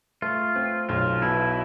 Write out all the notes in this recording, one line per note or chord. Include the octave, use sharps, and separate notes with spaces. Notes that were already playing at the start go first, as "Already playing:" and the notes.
A3 F4
C4
B1 F4
B2 E4